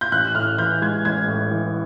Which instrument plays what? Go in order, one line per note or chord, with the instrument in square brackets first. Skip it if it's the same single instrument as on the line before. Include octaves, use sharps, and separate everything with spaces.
[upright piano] G6
[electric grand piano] A1 [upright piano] F#6
[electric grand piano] A2 [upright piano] F6
[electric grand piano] E3 [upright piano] G6
[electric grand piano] G#3 [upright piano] G#6
[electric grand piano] A1 [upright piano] G#6
[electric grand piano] A2
E3